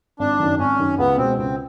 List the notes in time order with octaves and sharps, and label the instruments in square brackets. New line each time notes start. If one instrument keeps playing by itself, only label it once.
[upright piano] G#1 [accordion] D4
[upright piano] F#2 D#3
[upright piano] G#1 [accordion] C#4
[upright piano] F#2 D#3
[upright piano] C#2 [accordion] B3
[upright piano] B2 G#3 [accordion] C4
[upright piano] C#2 [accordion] C4